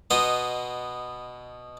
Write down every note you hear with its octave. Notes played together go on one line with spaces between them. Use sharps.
B2 B3 D#5 C6